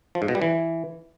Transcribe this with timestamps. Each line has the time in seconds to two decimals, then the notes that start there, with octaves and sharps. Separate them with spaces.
0.15 F3
0.22 G#2
0.28 B2
0.35 G3
0.42 E3